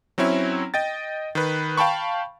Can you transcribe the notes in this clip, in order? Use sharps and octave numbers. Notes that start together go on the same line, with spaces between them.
F#3 C4 C#4 E4
D#5 G5 A6
D#3 B4
F5 G5 A5 B5 C#6